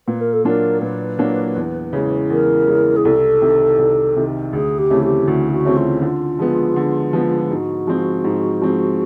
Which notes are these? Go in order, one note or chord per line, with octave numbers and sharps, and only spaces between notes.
A#2 B4
A#4
A4
F#3 A#3 D4 F4 A#4
A#2 B4
F#3 A#3 D4 F4
E2
C#3 E3 G#3
E2 A#4
C#3 E3 G#3
G#4
C2 A4
C3 D#3
C2
C3 D#3
D2 G#4
G4
C#3 E3 A3 C4
G4
D2 F#4
F#4
C#3 E3 A3 C4
F4
D3 F4
F3 G#3 B3
D3
F3 G#3 B3
G#2 F#4
F3 G#3 C4
G#2
F3 G#3 C4